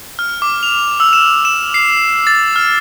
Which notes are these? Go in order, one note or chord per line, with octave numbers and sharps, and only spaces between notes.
F6
D6
F7
E6
E7
E7
C7
A6
F6